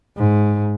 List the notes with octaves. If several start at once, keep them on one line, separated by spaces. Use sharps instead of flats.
G#2